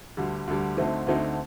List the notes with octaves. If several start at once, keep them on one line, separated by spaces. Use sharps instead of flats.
D2 D3 G3
D2 D3 G3
D2 D3 A3 C4 D#4
D2 D3 A3 C4 D#4